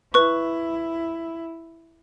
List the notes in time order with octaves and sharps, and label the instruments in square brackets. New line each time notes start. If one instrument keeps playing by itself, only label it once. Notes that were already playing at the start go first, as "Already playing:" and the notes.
[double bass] E4 [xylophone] B4 C#6